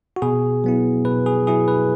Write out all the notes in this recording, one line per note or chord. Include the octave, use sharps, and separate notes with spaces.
F#4
B2 G#4
F#3 B3 E4
B2 B4
G#4
F#3 B3 E4 G#4
B4